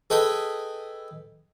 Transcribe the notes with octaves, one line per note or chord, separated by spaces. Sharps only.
G#4 A4 B4 D#5 G5 B5